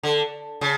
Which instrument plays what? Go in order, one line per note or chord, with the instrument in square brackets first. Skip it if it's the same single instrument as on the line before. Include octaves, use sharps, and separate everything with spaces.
[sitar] D3
C#3